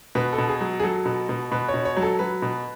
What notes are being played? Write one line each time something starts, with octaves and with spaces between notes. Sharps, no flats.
B2 B4
A4
B2
G#4
F#3
G#4
F#3 A4
B2
B2
B2 B4
C#5
B2
C#5
F#3
A4
F#3 B4
B2